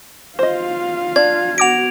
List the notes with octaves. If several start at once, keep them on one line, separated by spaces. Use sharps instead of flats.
F4 C5 D#5 F5
D4 D5 G#6
B3 F#4 F#5 D6 A#6 D7 F7